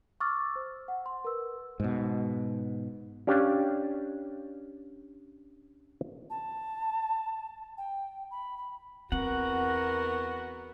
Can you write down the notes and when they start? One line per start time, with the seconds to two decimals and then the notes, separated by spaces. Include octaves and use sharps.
0.20 C#6 D6 E6 F6 A6
0.56 C5
0.88 F#5
1.06 C6
1.25 A#4 B4 E6
1.80 G#2 B2
3.27 C#4 D4 G4 F5
6.30 A5
7.78 G5
8.31 B5
8.58 B5
9.12 E2 B3 C4 F#4 A#4 F#5